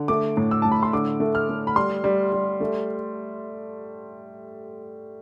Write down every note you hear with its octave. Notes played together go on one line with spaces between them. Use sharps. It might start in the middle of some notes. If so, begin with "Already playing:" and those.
Already playing: D3
A3 D6
A2
E6
A2 A5
B5
C6
D3 D6
A3
F6
A3
B5
G3 C6
G3
G3
A3